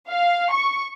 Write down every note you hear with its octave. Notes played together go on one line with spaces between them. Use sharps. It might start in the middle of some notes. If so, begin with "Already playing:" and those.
F5
C#6